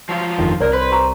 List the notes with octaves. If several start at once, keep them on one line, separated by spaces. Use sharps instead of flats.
F3 F#3 F4
G1 F2 D#3
C2 A#4 C#5 D5
B4 C5
G4 A#5